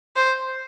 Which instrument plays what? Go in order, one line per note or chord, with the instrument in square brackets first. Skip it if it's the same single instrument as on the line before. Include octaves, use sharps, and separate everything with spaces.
[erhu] C5